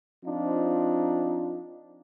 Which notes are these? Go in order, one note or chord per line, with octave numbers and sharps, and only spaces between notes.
F3 C4 D4 D#4 F4